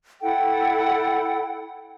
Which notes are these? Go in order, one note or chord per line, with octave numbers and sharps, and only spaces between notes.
E4 A4 F#5 G5